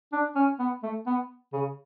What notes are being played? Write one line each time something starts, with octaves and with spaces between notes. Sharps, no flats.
D4
C#4
B3
A3
B3
C#3